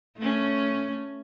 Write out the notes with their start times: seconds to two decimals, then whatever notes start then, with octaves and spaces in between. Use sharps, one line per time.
0.18 A3 C#4